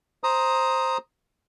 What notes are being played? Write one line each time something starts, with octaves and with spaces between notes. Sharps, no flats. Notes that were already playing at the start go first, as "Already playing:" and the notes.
C5 A#5 D#6